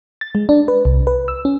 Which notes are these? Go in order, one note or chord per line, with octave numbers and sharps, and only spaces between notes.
A6
G#3
D4
B4
C2
B4
E6
C#4